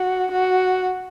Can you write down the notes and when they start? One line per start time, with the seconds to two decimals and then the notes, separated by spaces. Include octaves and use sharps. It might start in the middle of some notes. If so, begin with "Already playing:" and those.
Already playing: F#4
0.32 F#4